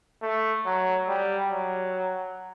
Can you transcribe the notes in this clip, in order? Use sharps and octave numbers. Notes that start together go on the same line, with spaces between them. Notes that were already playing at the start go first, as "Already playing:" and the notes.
A3
F#3
G3
F#3